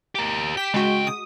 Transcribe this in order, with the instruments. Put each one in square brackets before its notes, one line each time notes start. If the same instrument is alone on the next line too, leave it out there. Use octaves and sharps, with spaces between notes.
[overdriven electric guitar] G4 A#4
[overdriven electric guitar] G4 [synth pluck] B6 E7
[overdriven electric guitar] C#3 G5 [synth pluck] G#3 F#4
[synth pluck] D#6